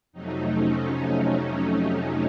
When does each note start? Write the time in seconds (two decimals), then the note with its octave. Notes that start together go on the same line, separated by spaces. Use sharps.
0.13 F2 C3 F#3 A3 D#4
0.50 C#4